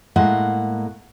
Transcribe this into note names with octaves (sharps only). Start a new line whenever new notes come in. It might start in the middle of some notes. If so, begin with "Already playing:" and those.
A2 G#3 A#3 F#5